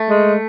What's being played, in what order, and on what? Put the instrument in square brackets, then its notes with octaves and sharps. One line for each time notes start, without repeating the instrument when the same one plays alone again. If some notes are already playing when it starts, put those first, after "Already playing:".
Already playing: [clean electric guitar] A3
[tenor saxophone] G#3